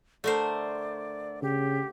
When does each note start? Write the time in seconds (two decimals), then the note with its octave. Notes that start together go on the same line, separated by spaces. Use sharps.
0.24 D3 A3 A#4 C5 D5
1.42 C#3 G4